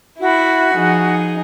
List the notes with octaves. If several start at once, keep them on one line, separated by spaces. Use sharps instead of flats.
E4 F#4 B5
F3 D#4 G#4